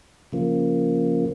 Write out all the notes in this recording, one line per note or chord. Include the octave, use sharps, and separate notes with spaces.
C#3 F3 A#3